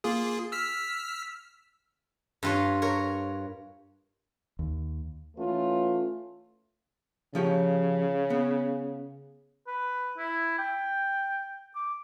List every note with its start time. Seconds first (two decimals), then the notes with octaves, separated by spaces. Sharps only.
0.04 A#3 F4 G#4
0.52 E6 F6 B6
2.43 G2 F4 C#5
2.82 A#4 C#5
4.59 D#2
5.37 E3 A3 C#4 F4 B4
7.35 C#3 F3 G4 C#5
8.30 B3
9.67 B4
10.18 E4
10.58 G5
11.75 D6